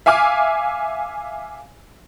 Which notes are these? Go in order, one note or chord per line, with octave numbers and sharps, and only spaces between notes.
E5 F5 G#5 D6 F6